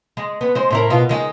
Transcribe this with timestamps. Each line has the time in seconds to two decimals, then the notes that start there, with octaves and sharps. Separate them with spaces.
0.17 G#3
0.41 B3
0.55 G#3 C5
0.70 A2 E4 A#4
0.90 B2 B3 F4
1.09 D#3 G#3 G#4